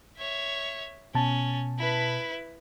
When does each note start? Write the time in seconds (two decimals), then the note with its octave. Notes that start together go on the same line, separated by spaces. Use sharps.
0.18 C#5 E5
1.15 B2 C#4 A5
1.78 E4 B4